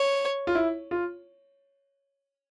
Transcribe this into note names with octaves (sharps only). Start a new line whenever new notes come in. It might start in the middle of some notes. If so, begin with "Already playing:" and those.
Already playing: C#5
F4
E4
F4